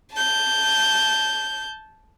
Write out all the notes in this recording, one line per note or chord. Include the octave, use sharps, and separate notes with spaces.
A5 G6